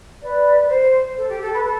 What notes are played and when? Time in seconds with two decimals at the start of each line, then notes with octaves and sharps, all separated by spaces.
0.21 B4 D5
0.61 B4
0.68 C5
1.17 A4
1.29 G4
1.41 A4
1.52 B4
1.64 A4